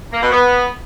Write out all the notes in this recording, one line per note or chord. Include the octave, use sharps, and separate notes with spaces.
A#3
B2
B3